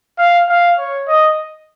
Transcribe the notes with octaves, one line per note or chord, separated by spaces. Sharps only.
F5
F5
C#5
D#5